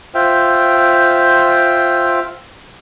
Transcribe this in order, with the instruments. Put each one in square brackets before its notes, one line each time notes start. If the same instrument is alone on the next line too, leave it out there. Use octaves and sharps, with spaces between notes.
[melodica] F4 C5 E5 G5